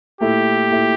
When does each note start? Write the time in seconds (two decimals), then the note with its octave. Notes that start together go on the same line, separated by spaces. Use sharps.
0.21 A#2 A3 E4 G4
0.71 A#2 A3 E4